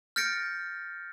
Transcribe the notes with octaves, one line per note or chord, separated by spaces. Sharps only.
F6 G6 A6 A#6 C#7 D7